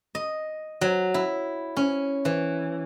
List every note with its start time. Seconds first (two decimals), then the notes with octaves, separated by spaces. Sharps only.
0.15 D#5
0.81 F#3
1.14 E4
1.77 C#4
2.25 E3